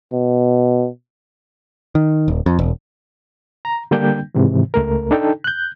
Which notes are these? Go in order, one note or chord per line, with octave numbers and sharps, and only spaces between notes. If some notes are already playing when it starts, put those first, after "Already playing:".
B2
D#3
D#1
F2
E1
A#5
D3 G3 A#3 D4 G5 G6
G#2 C3 D#3 E3
C#2 A3 A#4
D4 D#4 A4 G5
F#6 G6